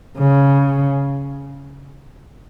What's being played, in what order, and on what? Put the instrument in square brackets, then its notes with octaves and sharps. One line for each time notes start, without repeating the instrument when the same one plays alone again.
[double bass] C#3